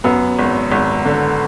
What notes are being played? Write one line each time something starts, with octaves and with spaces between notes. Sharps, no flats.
F#2 B3
G#1
G#1
D3